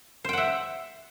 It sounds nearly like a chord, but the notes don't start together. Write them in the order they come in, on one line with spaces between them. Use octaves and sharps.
C5 G5 F#5 E5